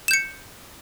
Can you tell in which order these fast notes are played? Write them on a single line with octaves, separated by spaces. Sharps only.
E7 G6 C#7